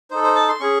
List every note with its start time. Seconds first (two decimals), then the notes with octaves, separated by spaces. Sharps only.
0.11 D#4 A4 C5
0.24 C5
0.35 A5
0.48 C6
0.60 C#4 G#4 C#6